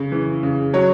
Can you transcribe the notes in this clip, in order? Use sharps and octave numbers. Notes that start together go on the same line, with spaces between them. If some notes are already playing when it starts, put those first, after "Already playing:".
Already playing: C#3
E3
C#3
F#3 C#5